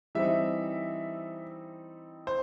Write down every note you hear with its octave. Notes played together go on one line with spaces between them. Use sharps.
E3 G3 C4 D#4 E5
C5